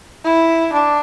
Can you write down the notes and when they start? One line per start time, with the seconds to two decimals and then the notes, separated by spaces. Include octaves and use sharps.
0.24 E4
0.73 D4